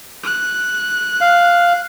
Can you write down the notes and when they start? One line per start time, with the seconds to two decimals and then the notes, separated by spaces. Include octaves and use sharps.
0.24 F#6
1.21 F5